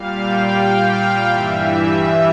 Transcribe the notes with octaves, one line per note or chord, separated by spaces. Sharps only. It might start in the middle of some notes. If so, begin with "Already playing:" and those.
Already playing: A#2 G3 F5
G5
F5
G2 E3 G3 E5